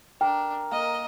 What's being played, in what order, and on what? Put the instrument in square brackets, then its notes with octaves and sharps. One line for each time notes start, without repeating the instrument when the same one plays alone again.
[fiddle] D4 [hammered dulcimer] A#4 [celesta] G5
[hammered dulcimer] A#3 [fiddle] D#5